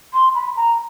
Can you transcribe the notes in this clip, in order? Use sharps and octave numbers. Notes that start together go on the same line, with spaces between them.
C6
B5
A#5